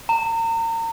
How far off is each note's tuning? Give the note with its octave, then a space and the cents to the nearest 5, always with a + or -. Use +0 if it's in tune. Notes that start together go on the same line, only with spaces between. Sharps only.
A#5 -35